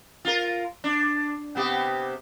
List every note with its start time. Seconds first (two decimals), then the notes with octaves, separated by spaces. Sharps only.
0.25 F4 A#4
0.84 D4
1.56 C3 B3 G4